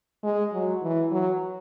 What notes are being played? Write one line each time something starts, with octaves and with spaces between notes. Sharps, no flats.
G#3
F#3
E3
F#3